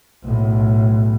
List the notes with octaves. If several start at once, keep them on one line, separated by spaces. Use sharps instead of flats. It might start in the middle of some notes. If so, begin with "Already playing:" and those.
B1 A2